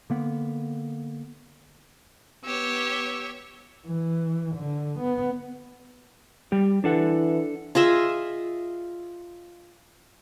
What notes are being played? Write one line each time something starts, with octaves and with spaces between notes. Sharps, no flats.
D3 A#3 B3
B3 G4 C#5 E6 G#6
E3
D3
B3
G3 G4
E3 D4 A4 F#5
F4 G#4 D#5 E5